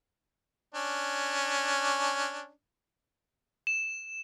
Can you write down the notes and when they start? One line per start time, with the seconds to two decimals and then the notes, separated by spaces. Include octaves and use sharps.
0.75 C#4 D4
3.67 E7